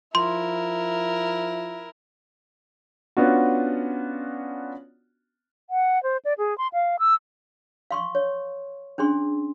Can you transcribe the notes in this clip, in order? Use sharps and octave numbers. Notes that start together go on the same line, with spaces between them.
F3 E4 A#4 C6
B3 C#4 D4 F4 F#4
F#5
C5
D5
G#4
C6
F5
E6
F5 C6 C#6
C#5
C#4 D4 G#4 C6